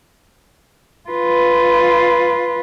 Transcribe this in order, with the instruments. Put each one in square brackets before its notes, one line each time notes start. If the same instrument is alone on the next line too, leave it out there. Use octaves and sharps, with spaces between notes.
[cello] F4 B4